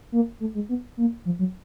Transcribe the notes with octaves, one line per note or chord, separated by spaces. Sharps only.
A#3
A3
G#3
B3
A#3
F3
F#3